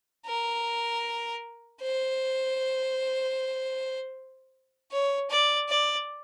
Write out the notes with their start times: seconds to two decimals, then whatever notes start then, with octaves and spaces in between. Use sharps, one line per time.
0.26 A#4
1.81 C5
4.91 C#5
5.30 D5
5.69 D5